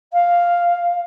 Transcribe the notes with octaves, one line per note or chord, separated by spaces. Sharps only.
F5